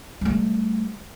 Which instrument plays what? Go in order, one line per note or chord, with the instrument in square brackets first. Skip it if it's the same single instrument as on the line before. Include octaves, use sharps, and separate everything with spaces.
[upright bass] G3 A3